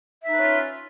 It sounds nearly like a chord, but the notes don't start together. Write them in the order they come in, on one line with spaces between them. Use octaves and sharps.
E5 D#4 B4 C#4 F4